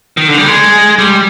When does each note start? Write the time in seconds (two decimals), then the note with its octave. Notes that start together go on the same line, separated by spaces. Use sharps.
0.17 D#3
0.28 D3
0.37 G3
0.48 G#3
0.99 G3